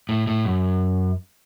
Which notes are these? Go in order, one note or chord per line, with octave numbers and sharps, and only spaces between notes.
A2
A2
F#2